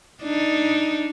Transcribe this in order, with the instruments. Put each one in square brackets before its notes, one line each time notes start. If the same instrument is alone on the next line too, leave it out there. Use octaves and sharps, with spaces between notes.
[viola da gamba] D4 D#4